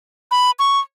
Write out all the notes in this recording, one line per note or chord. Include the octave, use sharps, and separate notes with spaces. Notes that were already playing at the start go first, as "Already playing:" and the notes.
B5
C#6